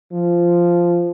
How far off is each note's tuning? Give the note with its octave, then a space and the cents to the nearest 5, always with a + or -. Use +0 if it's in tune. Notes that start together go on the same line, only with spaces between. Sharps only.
F3 -10